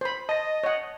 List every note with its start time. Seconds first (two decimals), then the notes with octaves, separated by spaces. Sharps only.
0.01 C5 B5
0.29 D#5 A5 A#6
0.64 C#5 F#5